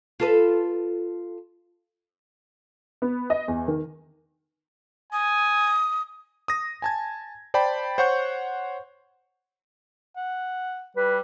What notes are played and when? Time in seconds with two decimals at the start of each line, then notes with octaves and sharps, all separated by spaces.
0.20 F4 A4 B4
3.02 B3
3.30 D#5
3.48 E2
3.68 D#3
5.13 G#5 D#6
6.48 D#6 A#6
6.82 G#5 A5 G#6
7.54 C5 D5 G5 A5 B5
7.98 C5 C#5 F#5 C#6 G6
10.17 F#5
10.97 G3 B4